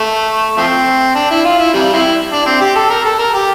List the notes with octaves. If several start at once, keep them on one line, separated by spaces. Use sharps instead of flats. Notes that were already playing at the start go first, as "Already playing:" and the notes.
Already playing: A3
F3 A3 C4
D4
E4
F4
E4
C3 E3 G3
G3 C4 E4
D4
C4
G4
A4
A#4
A4
A#4
G4